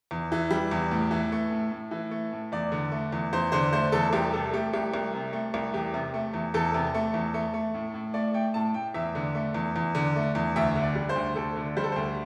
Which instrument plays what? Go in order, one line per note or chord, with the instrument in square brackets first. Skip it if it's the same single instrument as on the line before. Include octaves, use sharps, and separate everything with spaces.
[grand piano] E2
E3
G3
E2
A2
E3
A3
A2
A2
E3
A3
A2
E2 D5
D3
A3
E2
E2 C5
D3 C5
A3 C5
E2 A4
C2 G4
C3 A4
A3 G4
C2 G4
C2
C3
A3
C2
E2 G4
C3
A3
E2
E2 A4
C3
A3
E2
A3
A3
A2
A2
A3 D5
A3 G5
A2 A5
A2 G5
E2 E5
D3
A3
E2
E2
D3
A3
E2
D2 E5
D3
D5
G3
C5
D2
D2 A4
D3
G3 C5
A4
D2 C5